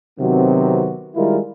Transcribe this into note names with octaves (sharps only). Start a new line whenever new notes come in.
C3 D#3 F#3 B3 C4 F#4
D#3 G3 G#3 E4 F4 A#4